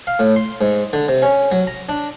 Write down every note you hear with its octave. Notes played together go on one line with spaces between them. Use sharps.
F5
A2
C6
G#2
D3
C3
C#4
F#3
A#5
D4